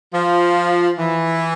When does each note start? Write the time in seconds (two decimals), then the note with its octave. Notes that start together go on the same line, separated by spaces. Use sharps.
0.13 F3
0.99 E3